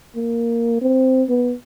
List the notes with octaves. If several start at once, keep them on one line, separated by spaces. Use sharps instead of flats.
A#3
C4
B3